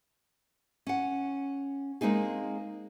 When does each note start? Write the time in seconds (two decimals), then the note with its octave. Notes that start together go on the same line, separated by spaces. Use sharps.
0.87 C#4 F#5
2.01 G#3 A#3 C4 D#4 G#4